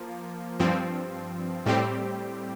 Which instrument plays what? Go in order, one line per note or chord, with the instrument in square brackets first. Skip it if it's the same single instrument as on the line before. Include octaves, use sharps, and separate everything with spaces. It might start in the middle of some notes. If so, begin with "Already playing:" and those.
Already playing: [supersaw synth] F3 A#3
G2 F3 C4
A2 G3 C4 G4